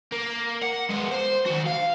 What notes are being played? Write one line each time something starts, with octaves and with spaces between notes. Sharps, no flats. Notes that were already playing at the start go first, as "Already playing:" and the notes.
A#3
F#5
G#3 B3
C5
D#3 F#4
F5